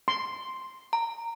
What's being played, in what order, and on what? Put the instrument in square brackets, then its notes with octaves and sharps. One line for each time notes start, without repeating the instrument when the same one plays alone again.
[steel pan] C6
[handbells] A#5